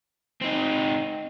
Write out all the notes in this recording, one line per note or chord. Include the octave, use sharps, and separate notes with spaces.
C4 D#4